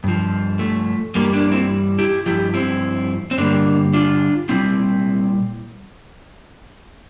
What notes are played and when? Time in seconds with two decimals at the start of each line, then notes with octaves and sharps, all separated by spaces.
0.04 G2 F3
0.59 A3
1.15 G2 E3 G3 A#3
1.33 A#3 D4
1.52 C4 E4
1.99 E4 G4
2.26 G2 F3 E4 G4
2.54 C4 E4
3.31 C4
3.38 G2 D3 G3 A#3 D4
3.93 D4 F4
4.49 A#2 G3 C4 E4